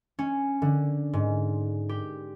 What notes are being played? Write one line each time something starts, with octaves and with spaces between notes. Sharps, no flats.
C#4
D3
G#2
G4